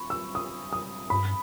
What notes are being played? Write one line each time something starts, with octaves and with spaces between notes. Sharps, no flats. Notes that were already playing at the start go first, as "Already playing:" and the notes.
Already playing: B5 C#6
E6
D#6
D#6
G2 B5